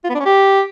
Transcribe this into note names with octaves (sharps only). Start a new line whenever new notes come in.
F4
B3
D4
C#4
G4